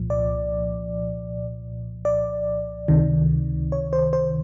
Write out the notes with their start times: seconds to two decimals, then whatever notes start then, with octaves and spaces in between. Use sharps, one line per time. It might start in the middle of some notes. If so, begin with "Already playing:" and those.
Already playing: C2 A#2 F3
0.10 D5
2.05 D5
2.88 C#2 C3 D#3
3.72 C#5
3.93 C5
4.13 C5